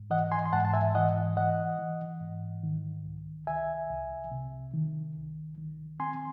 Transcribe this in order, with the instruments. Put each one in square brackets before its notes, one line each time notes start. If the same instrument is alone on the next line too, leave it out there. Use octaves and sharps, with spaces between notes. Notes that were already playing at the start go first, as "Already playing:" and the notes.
Already playing: [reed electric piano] G#2
E3 D#5 F#5
G#5 C6
C6
G#2 F#5 A5
A5
E5 G#5
E3 D#5 F#5
E3 D#5 F#5
E3
G#2
D#3
C2
C2 E5 G#5
C2
C3
D#3
C2
D#3
C4 G#5 C6